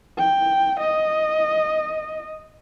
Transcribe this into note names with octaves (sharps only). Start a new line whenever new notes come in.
G5
D#5